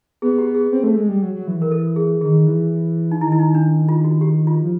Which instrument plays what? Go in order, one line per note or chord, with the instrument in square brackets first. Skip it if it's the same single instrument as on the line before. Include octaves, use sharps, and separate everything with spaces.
[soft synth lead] B3 [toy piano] G#4
[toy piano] G4
G#4
[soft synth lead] C4
A3
G#3
G3
F#3
F#3
E3
[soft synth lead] E3 [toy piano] A#4
[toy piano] A4
G#4
[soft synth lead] D#3 [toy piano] G#4
[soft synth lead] E3
[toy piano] D#4
[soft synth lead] D#3 [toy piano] E4
[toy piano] E4
D#4
D4
F4
F#4
G4
F4
[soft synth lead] F3